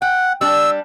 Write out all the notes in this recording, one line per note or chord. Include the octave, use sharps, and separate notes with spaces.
F#5 G5
G3 D4 E6